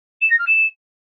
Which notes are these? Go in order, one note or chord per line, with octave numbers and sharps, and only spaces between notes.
E7
A#6
F6
E7